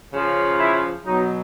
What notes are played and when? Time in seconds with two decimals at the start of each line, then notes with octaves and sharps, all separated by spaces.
0.13 C#3 F3
0.59 E4
1.05 B2 F#3 D#4